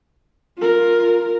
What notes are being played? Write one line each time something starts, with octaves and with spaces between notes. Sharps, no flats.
F4 A#4